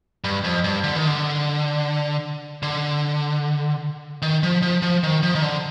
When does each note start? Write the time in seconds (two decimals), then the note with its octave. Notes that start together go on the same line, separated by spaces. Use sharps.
0.24 G2
0.44 F2
0.64 G2
0.84 D3
0.96 D#3
1.07 D3
2.63 D3
4.22 D#3
4.43 F3
4.62 F3
4.82 F3
5.03 D#3
5.23 F3
5.35 D#3
5.42 D3